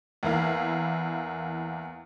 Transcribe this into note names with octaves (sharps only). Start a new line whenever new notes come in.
E2 A#3 E4 F5